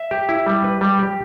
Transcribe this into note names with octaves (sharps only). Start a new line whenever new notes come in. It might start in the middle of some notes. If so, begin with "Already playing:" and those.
Already playing: E5
G4
E4
G3
B4
G3
G4